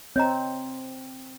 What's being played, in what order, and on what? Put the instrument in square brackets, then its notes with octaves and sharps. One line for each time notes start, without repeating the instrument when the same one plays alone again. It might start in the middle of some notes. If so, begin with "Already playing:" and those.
[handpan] C4 [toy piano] C#5 D#5 A#5